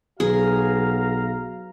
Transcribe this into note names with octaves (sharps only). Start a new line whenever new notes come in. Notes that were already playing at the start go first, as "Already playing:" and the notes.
B1 F#4 G#4 F5 A#5